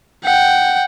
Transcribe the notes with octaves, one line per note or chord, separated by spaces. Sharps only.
F#5 G5